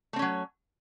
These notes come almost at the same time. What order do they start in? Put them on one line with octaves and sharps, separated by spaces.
A3 C4 C#4 F#3